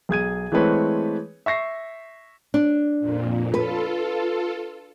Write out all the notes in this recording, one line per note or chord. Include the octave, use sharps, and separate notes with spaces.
B1 G#4 G#6 D#7
E3 G#3 A3 C4 B4 C#5
E5 C#6 A#6 C7
D4
F2 A#2
F4 A4 B4